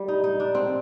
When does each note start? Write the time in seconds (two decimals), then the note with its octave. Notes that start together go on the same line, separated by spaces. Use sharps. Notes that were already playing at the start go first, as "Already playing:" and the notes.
Already playing: G3
0.08 D#4
0.24 D#4
0.40 D4
0.55 C4